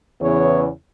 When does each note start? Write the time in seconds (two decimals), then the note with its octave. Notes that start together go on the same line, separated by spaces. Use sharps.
0.21 E2 C#3 E3 B3 C#5